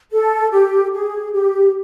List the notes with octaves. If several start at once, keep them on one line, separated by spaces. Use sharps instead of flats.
A4
G4
G#4
G4